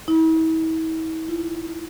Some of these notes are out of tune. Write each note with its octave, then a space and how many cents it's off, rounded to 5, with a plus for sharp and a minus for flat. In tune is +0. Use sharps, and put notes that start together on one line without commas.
E4 -40
E4 +45